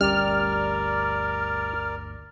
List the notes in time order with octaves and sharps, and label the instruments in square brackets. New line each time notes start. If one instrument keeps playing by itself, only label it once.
[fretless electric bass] G1 D2 C#4 [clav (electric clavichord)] G3 [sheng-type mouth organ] A#4 D5 [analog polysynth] F6